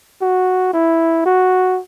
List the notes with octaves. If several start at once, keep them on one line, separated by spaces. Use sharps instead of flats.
F#4
E4
F#4